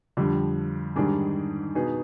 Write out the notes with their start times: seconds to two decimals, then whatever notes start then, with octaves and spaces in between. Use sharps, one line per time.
0.17 F2 D3 G3
0.96 G#2 D#3 G3 D4 G#4
1.75 B2 B3 D#4 G#4